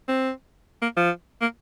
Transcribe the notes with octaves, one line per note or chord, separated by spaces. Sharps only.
C4
A#3
F3
A#3